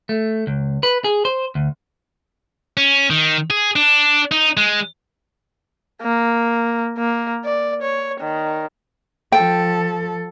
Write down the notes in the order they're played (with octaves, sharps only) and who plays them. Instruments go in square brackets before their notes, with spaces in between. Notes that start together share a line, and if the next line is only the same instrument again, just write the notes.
[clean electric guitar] A3
C#2
B4
G#4
C5
D2
[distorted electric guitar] C#4
D#3
G#4
D4
D#4
G#3
[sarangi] A#3
A#3
D5
C#5
D#3
[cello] F3 A4 [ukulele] G5